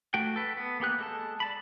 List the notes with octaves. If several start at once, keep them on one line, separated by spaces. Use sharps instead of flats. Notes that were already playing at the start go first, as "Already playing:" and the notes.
A3 F#4 G5
A4 B4
B3
A#3 B3 G4 F#6
G#3 A4 A5
D5 A5 B5